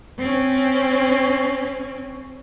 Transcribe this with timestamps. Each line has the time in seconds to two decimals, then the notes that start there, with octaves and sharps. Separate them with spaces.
0.19 C4 C#4